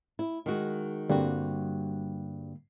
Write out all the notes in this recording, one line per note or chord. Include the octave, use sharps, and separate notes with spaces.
E4
D#3 G#3 F#4
G2 D3 G3 A#3 C4 F#4